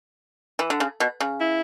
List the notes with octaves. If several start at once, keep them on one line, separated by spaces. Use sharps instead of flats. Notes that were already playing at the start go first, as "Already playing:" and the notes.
E3
D3
C#3
B2
C#3
E4